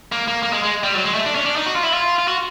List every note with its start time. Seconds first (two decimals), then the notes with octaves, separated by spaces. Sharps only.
0.12 A#3
0.28 A#3
0.43 A#3
0.53 G#3
0.63 G#3
0.83 G3
0.94 F#3
1.04 G#3
1.15 A3
1.25 D4
1.35 C#4
1.45 D4
1.56 D#4
1.66 F#4
1.76 F4
1.84 E4
1.93 F4
2.19 F4
2.28 F#4